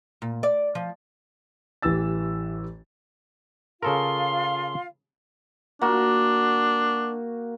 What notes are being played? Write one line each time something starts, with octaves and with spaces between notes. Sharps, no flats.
A#2
D5
F3
A1 E3 G4 E6 A6
C#3 F4 A4 A#4 F5 C6
A#3 D4 F#4